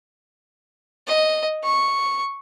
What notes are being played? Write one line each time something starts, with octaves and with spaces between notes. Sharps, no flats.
D#5
C#6